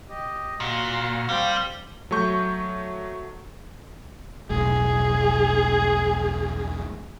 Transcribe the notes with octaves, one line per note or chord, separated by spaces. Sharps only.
G4 D#5
A#2 F#4 F6
G3 C4 F5
F#3 A3 C#6 G6
E1 B1 A2 G#4